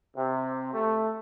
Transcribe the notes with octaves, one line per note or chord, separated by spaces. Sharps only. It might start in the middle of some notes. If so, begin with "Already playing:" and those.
C3
A3